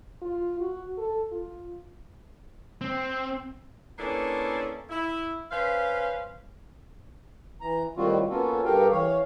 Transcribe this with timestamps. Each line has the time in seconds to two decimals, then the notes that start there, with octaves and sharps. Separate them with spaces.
0.22 F4
0.60 F#4
0.98 A4
1.32 F4
2.81 C4
3.98 A#3 B3 C#4 D4 E4 A4
4.90 E4
5.51 C#4 B4 C5 F5
7.61 E3 A#5
7.97 A2 D#3 G3 C4 F4 F#4
8.30 A#3 B3 C#4 F4 F#4 A4
8.65 G2 G4 A4 A#4 F5 G5
8.91 E3 C#5 F5